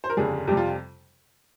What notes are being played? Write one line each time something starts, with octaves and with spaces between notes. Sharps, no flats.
C5
A#4
G1 F2 C#3 G3 G#4
F2 C3 G3 G4
F4